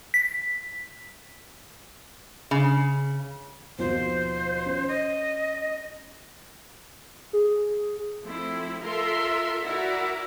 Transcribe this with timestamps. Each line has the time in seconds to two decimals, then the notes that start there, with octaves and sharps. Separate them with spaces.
0.14 B6
2.51 C#3
3.79 D#2 B2 F3 C5
4.66 C#4
4.88 D#5
7.33 G#4
8.22 F3 A3 C4 E4
8.81 F4 A4 A#4 E5 C6
9.65 E4 F#4 A#4 D5 E5 F#5